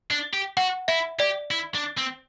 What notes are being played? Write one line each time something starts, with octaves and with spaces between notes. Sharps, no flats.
D4
G4
F#4 F#5
E4 E5
G4 D5
E4
D4
C4